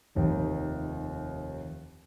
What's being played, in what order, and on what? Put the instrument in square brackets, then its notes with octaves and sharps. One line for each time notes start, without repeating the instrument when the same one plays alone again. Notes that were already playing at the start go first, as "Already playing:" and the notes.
[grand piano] F1 D#2 D#3